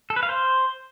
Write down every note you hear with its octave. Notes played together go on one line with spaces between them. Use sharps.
A4
B4
F5
C5